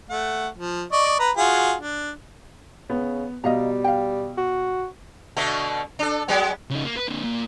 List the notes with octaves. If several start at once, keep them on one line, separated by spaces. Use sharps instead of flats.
A3 F#5
F3
D5 D#5 C#6
B4 A#5
F4 F#4 G#4
D4
C#3 B3
B2 G3 D#5 F5 A#5
F5 G5
F#4
B2 D3 A3
D4 A4
F#3 G#3 B3
C#3 D#4
A#3
B4
A#2 D3
A#2